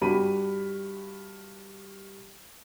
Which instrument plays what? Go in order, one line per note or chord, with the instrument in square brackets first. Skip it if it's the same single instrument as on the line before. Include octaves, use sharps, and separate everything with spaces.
[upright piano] G2 F#4 G4 B5 D#7